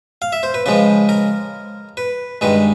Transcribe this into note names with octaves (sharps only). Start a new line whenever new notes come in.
F5
E5
C5
B4
C#3 F3 G#3 B4
A#4
B4
G2 D#3 G#3 B4